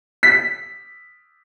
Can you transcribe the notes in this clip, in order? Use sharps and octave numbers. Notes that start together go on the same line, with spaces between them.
B6